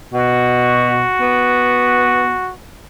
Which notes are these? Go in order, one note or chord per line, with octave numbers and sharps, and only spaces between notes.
B2 F#4
B3